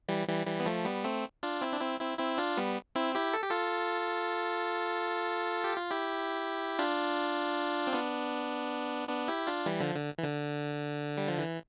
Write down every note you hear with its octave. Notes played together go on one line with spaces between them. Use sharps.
E3 G3
E3 G3
E3 G3
B3
F3 A3
G3 B3
A3 C4
D4 F4
C4 E4
D4
C4 E4
C4 E4
C4 E4
D4 F4
G3 B3
C4 E4
E4 G4
A4
G4
F4 A4
G4
F4
E4 G4
D4 F4
C4
B3 D4
B3 D4
E4 G4
D4 F4
E3 G3
D3 F3
D3
E3
D3
G3
F3
E3